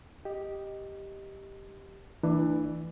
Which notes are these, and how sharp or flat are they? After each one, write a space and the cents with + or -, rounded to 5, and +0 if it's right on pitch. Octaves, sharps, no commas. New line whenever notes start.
G4 +0 D#5 +0
E3 +0 A3 +40 D4 +20